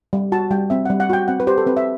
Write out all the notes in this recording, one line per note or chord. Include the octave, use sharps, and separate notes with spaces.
G3
F#4 A5
G3 G5
C4 E5
G3 F#5
F#5
F#4 G5
C4 F#5
B4
G4 C5
A4
C4 B4
E5